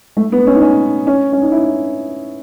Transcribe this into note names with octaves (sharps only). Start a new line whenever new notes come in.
A3
B3
C#4
D#4
C#4
C#4
C#4
D#4
E4